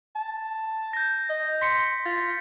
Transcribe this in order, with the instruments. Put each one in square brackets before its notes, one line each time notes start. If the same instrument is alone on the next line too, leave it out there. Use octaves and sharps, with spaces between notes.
[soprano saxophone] A5
[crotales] G6 A#6
[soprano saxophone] D#5
[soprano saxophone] C6 [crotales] B6 C#7
[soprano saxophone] F4 [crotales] A6